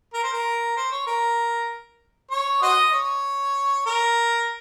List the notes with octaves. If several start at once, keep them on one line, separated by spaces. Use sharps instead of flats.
A#4
C5
A#4
C5
C#5
A#4
C#5
F#4 C5 D#5
C#5
A#4